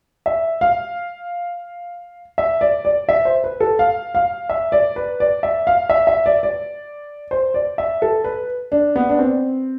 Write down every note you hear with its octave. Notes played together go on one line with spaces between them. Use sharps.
E5
F5
E5
D5
D5
E5
C5
B4
A4
F5
F5
E5
D5
B4
D5
E5
F5
E5
E5
D5
D5
C5
D5
E5
A4
B4
D4
B3
D4
C4